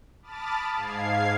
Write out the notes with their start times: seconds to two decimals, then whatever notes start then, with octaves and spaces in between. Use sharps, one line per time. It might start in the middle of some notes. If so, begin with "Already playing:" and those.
0.23 A5 B5 D6 D#6 F6 A6
0.75 G#2 F5 G#6 C7